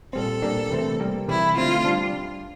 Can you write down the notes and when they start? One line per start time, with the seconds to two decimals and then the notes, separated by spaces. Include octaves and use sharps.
0.13 A#2 G3 C4 A4
0.42 A#2 G3 A#3 D4
0.70 C3 E3 A3 C4
1.00 C3 G3 A#3
1.28 C3 E3 G3 E4
1.57 D3 A3 C4 F4
1.85 G3 D4